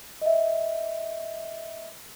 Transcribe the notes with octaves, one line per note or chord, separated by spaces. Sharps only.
D#5 E5